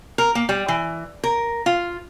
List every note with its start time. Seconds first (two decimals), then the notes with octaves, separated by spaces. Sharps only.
0.18 A#4
0.35 A#3
0.49 G3
0.68 E3
1.24 A#4
1.66 F4